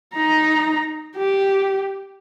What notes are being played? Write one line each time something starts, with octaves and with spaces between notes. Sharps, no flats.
D#4 A#5
G4